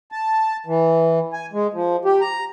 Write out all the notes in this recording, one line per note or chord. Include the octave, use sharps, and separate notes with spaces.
A5
E3
G#5
G#3
F3
G4
A#5